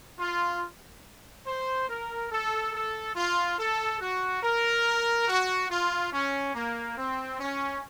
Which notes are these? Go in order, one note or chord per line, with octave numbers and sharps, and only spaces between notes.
F4
C5
A#4
A4
A4
F4
A4
F#4
A#4
F#4
F4
C#4
A#3
C4
C#4